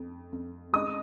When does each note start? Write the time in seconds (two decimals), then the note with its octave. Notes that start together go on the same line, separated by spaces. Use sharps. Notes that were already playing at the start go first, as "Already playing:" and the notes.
Already playing: F2
0.33 F2
0.73 G#3 D#5 D#6